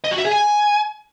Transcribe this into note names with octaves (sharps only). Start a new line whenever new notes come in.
D#5
F#4
E5
G#4
G#5